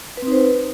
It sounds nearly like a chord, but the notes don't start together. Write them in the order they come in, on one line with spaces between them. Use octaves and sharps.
B4 C4 D#4 C5